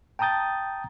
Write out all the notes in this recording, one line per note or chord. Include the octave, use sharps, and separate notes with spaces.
G5 A5 A#5 D#6 G6 A6